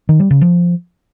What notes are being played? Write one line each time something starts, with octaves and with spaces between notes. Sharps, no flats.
D#3
G3
C#3
F3